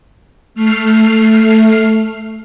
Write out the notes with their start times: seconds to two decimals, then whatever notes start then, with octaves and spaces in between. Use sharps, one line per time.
0.55 A3 F6 C7